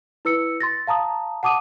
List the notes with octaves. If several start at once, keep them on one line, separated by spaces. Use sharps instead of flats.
E4 B4 E6 C#7
C6 A6 A#6
F5 A5 A#5 D#6
F#5 A5 D6 D#6 D#7